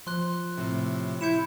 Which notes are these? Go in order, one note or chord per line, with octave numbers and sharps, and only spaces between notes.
F3 C6 F#6
A2 C3
E4 G6 C#7 E7